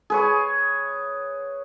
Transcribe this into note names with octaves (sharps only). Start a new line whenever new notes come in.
G#4 B4 C#5